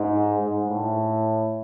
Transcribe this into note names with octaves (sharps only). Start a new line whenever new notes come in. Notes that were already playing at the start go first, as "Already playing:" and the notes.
Already playing: G#2
G#2
A2